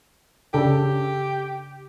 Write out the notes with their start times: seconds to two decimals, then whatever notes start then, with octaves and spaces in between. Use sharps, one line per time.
0.54 C#3 D4 G4 A4